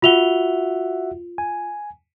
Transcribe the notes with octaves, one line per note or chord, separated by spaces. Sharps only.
F4 F#4 E5 F#5 F7 G7
G#5